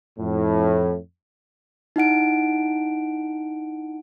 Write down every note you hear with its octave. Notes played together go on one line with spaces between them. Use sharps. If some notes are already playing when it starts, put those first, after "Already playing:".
F2 A2
D#4 E4 F#5 D7